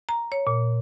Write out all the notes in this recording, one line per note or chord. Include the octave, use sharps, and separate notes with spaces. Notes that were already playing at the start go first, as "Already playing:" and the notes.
A#5
C#5
A#2